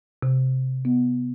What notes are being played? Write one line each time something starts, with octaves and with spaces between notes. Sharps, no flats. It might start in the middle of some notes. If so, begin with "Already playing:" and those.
C3
B3